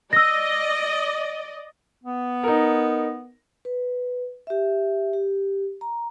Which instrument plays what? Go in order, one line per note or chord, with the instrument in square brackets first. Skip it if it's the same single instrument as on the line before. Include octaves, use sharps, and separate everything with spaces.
[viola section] D5 D#5 [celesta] E6 A#6
[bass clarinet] B3
[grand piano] D#4 A#4
[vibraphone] B4
G4 E5
G4
A#5